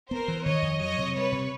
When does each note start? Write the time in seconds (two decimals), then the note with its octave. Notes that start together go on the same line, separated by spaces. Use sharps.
0.10 B3 A#4 C5
0.28 E3
0.45 D#3 C#5 D#5
0.62 F2
0.80 F#3 C#5 D#5
0.98 C3
1.15 G3 B4 C#5
1.32 C3